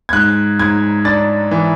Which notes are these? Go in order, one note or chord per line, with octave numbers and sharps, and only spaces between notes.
G#6
G#2 F#6
G#2 G#6
D4 A6
E3